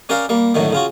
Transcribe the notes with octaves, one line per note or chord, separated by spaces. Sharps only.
C#4 G4 A#4 D5 F5
G3 A#3
F#2 A2 D3 D#3 F#3
C#3 F4 F#4